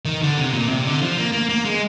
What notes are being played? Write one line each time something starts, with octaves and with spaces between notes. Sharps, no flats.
D#3
D3
C3
A#2
C3
D3
F3
A#3
A#3
A#3
G#3